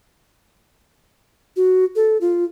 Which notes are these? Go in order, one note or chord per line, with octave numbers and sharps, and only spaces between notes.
F#4
A4
F4